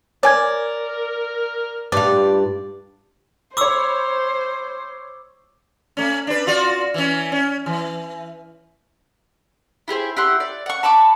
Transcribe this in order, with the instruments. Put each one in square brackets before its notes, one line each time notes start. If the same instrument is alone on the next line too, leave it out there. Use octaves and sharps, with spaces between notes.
[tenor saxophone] A#4 [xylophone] C#5 G#5 G#6 [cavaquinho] D5
[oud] G2 F4 [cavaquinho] D5
[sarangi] C5 [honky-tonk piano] C#5 B5 [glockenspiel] D6 E6
[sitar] A3 C#4
D4 B4
F4 F#4 D5
E3 C#4
C#4
E3
[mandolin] E4 G4 G#4 C5
E4 G4 F#5 C6
D5
F#5 C#6
A5 B5 C#6 D6